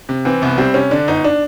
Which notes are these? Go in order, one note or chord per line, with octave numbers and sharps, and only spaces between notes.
C3
E3 C4
C2 B3
G3 C4
C3 C#4
D3 D4
G1 D#4
D4